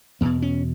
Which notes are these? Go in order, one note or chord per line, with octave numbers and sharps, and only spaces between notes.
E2 B2 B3
C#4